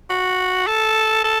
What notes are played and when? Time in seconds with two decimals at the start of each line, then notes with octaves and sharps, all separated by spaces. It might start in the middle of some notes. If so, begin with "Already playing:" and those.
0.10 F#4
0.67 A4
1.24 A4